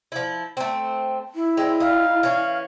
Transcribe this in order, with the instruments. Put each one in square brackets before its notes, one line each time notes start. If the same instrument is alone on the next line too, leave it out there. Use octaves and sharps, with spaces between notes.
[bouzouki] F3 E4
A3 C4
[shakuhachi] E4
[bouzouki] G#3 C4 [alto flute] G5
[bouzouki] D#4 [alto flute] F5
[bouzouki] E3 C#4